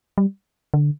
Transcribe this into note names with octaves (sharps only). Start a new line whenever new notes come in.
G3
D3